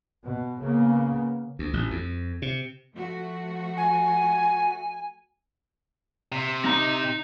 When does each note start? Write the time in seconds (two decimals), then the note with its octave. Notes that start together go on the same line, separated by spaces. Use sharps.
0.24 B2
0.60 C#3 A#3 B3
1.59 D2
1.73 A1
1.91 F2
2.42 C3
2.94 F3 A3 F#4
3.77 G#5
6.32 C3
6.65 D#4 A#5